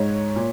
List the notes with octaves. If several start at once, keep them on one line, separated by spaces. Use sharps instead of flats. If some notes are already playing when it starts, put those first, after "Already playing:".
Already playing: G#2 G#3 C#5
A#2